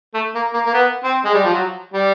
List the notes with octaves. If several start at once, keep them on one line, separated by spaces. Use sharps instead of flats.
A3
A#3
A#3
A#3
B3
C4
G#3
G3
F3
F#3
G3